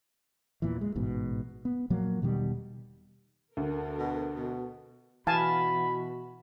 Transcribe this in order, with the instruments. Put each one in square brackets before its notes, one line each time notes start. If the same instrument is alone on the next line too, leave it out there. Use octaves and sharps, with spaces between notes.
[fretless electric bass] E2 A#2 E3
G#3
A1 G#2 B2
B3
A#2 F3 F#3 A#3
E1 B2 D#3 G3
[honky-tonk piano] D2 [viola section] A4 A#4
[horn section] B2
B2
[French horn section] B2 F#4 [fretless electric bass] E3 [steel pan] F5 G#5 A5 [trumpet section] B5